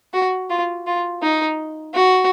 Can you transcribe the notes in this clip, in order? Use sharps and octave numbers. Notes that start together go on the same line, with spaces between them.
F#4
F4
F4
D#4
F#4